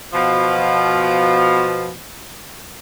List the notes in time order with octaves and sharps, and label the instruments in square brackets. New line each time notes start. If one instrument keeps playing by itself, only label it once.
[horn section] B2 F3